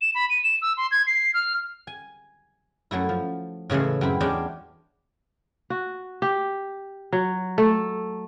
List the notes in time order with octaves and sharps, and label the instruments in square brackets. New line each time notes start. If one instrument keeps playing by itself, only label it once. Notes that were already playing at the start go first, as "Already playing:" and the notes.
[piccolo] E7
B5
D#7
E7
E6
C6
G#6
C7
F6
[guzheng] G#5
F#2 F#3 A3 E4
F3
A2 C#3 E3 G#3 A3
F#2 C4 E4 B5
E2 G#3 C#4 D4 G#4 G5
[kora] F#4
G4
F#3
A3